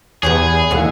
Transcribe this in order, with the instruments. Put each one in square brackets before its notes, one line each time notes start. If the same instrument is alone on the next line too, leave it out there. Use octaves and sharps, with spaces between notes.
[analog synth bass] E2 [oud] E3 G4 B4 [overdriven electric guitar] G#4
[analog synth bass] D#2 [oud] D3 E3 G#3